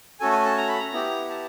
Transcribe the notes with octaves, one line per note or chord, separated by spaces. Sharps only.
A3 C#4 F#4 A4 G#5
G#5
A5
A#5
B5
A#5
B3 E4 G4
A5